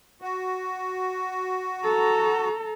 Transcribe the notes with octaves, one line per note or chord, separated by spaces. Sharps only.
F#4
A4 A#5